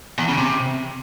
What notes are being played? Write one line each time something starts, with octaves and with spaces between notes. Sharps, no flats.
E2
C#3
C3